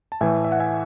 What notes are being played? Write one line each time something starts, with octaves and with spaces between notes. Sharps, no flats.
A5
A2 E3 A3 E5 G#5
E5
F#5
E5 G#5